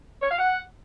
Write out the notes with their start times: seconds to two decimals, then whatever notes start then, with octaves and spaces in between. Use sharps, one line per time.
0.21 C#5
0.30 F5
0.39 F#5